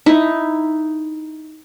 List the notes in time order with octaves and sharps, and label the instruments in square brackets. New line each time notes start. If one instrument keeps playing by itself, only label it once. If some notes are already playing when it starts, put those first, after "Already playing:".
[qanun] D#4 E4